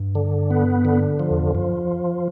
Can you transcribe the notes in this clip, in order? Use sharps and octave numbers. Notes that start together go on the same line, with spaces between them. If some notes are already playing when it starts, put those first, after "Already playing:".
Already playing: G2
D3
B3
D3
F3
E2
F2
F#2 F3